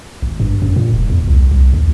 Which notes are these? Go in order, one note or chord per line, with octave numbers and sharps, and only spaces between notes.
G#1
G2
F#2
A#2
E1
E2
C2
C2
D#2